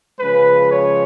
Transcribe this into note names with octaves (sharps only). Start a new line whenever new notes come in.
C#3 F3 G#3 B4
C#5